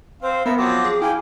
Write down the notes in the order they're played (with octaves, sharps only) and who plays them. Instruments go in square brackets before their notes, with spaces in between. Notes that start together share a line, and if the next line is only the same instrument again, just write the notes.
[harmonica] C4 F5 [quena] C5
[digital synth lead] B3 [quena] A#4 [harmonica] B4 E5
[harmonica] F3 F#3 C4 [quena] D6
[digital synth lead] G#4
[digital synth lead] E4 [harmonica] F5 G5 G#5